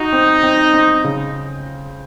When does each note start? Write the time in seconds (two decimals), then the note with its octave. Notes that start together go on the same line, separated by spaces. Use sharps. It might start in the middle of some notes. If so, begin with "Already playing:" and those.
Already playing: D#4 F#4
0.13 C4
0.43 C4
0.73 C4
1.04 C#3